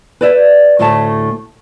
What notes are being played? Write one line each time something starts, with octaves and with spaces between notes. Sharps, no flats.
B4 D5 E5
D2 A2 A3 C#5 E5 A5